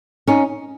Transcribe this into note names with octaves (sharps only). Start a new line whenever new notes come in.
C#4 D#4